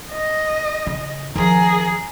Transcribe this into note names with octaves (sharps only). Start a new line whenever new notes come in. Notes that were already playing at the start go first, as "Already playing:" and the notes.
D#5
C#3
D#3 F3 G#4 A#4